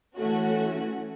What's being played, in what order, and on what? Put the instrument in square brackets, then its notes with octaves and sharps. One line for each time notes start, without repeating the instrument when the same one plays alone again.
[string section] E3 A3 C#4 F#4